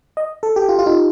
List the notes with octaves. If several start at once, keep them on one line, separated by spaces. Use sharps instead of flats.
D#5
A4
G4
F4
F4
D#4